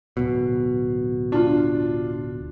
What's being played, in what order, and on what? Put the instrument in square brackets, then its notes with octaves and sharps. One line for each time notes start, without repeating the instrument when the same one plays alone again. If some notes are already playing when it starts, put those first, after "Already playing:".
[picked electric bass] D1 B2
[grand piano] D4 F4